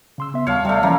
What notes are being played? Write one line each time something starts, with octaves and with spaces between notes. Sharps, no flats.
C#3 C6 E6
B3 E5
D#2 G3 C#5 F5 A5
C3 G3 A3 D5
E3 F3 A#3 C#4